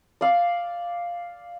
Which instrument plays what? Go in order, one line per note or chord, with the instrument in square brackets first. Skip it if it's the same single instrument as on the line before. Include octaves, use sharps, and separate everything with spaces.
[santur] D5 F5